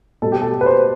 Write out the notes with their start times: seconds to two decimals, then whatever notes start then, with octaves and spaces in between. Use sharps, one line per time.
0.22 B2 G3 B3 A4
0.32 G4
0.42 A4
0.61 B4
0.66 C5